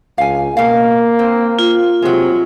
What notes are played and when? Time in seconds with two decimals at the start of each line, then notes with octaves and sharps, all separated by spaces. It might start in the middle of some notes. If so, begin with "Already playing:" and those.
0.18 C#2 F5 G#5
0.57 B2 A#3 F5
1.19 C4
1.59 F4
2.02 C3 F#3 G#3